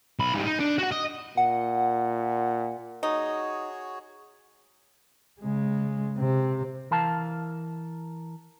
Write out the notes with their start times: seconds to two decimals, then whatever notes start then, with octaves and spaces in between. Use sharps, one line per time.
0.19 B1 B5
0.34 G#2 G3
0.46 D#4
0.60 D4
0.79 F#4 F#5
0.92 D#5
1.37 A#2 F#5
3.03 D#4 F#4 G#4 C#5
5.41 C#3 G#3
6.18 C3 C4
6.91 E3 A#4 F5 A5